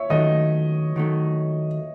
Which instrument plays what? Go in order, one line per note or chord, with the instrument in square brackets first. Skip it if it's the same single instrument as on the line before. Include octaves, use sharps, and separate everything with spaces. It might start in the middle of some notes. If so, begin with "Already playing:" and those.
Already playing: [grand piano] C#5 E5
[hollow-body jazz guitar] D#3 F#3 A3 [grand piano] D#5
[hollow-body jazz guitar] D#3 F#3 A3